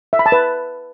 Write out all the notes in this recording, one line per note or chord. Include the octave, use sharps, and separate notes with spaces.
E5
B5
A5
B4